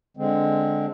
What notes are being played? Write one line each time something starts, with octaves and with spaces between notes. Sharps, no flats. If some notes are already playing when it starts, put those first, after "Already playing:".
D3 G#3 C4